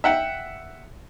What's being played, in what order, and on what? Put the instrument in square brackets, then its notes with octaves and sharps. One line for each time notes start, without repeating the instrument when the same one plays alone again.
[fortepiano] E5 F#5 G5